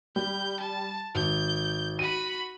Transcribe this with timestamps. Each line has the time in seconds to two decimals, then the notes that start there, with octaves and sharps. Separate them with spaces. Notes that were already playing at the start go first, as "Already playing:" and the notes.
0.16 G3 G6
0.60 A5
1.15 G#1 G6
1.99 F#4 B5 D#7